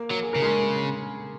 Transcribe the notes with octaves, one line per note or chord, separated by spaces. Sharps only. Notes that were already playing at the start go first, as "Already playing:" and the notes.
Already playing: A#3 A#4
F#3
G#4
C#3 A#4
G#3 G#4